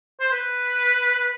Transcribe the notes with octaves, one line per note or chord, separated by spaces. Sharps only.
C5
B4